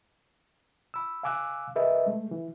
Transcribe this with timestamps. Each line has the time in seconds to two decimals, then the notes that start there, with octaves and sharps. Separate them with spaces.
0.94 B5 E6
1.23 F5 G#5 D6 E6 F#6
1.76 G#4 A#4 B4 D#5 E5
2.06 G#3 A3
2.31 E3